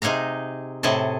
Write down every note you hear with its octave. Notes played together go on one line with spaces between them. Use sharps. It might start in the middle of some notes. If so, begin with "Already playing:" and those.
C3 D#4 G#4 F5 A#5
A2 C3 G#4 D#5 A5